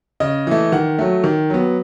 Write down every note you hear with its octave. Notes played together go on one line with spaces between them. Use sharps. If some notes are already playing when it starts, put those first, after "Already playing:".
C#3 D#5
E3 A3
D#3 F#5
F#3 A3
D#3
F#3 B3